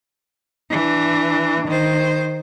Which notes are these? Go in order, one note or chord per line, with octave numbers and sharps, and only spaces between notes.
E3 D4
D#3 C5